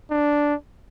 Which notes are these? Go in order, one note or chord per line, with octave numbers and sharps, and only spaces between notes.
D4